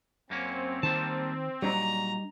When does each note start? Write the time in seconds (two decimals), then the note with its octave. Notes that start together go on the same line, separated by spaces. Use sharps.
0.30 F#2 A#3 C4 C#4
0.83 D#3 G3 A#3 A5
1.62 A#2 F#3 G3 D4 D#4 A#5